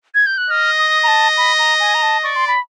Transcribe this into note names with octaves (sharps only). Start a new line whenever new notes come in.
G#6
G6
F#6
D#5 F6
D#6
A#5
A5
B5
A#5
G#5
A#5
A5
D5 C#6
C6
B5